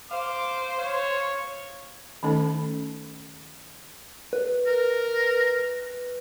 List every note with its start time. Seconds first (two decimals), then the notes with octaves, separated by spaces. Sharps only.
0.11 C5 F5 D6
0.79 C#5 F5
2.23 D#3 A3 C#4 D#4 A4
4.33 B4
4.66 A#4